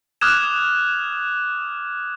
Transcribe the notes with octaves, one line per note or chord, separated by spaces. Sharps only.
D6 D#6 F6 F#6 G#6 E7